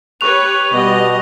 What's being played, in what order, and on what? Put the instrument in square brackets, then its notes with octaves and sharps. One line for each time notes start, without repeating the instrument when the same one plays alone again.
[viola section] G4 B4 C#5 [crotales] C#6 F#6 F7
[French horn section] B2 B3 [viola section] G3 D#5